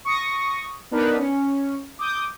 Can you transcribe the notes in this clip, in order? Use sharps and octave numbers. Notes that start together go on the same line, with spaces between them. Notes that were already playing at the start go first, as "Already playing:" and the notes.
C#6 D#6 A#6
B3 D4 D#4 A#4 B4
C#4
D6 D#6 G6